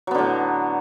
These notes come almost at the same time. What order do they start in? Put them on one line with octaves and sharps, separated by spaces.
F#3 B3 D3 A2